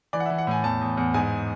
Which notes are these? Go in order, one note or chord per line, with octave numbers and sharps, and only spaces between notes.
E3 D5
F#5
E5
E3
F#5
A2 G#5
E2 A5
E2
E2
G#2 G#5